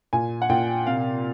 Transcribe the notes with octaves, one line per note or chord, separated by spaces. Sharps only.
A#2 G#5
F#5
A#2 G5
C3 F5